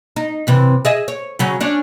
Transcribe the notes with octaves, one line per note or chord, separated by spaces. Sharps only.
D#4
F#2 C3 E3
G#4 D#5 E5
C#5
C#3 F#3 C#4
C#4 D4